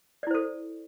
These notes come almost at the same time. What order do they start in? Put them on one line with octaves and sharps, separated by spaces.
D5 E4 C5 A4